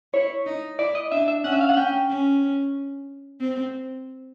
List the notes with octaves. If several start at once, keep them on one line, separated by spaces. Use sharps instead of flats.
E4 C#5
D#4
E4 D5
D#5
D4 E5
E5
C#4 F#5
E5
F5
F#5
C#4 G5
C#4
C4